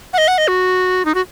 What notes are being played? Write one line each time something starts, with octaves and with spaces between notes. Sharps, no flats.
F#5
D#5
F#5
D#5
F#4
D#4
F#4